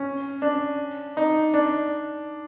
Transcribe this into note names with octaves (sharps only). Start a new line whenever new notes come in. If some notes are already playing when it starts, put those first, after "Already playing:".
Already playing: C#4
D4
D#4
D4